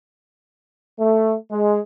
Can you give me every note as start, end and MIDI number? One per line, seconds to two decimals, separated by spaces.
0.99 1.35 57
1.50 1.79 56